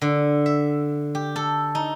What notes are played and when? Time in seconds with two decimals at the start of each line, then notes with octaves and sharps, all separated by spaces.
0.02 D3
0.46 E5
1.15 G4
1.36 A4
1.75 D#4